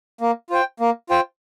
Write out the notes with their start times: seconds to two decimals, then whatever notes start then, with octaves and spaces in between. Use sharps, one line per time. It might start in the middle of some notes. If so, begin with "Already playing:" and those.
0.21 A#3
0.50 F4 C5 G5
0.80 A#3
1.10 F4 C5 G5